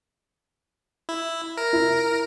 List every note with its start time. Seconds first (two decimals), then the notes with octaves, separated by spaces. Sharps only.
1.09 E4
1.57 A#4
1.73 E4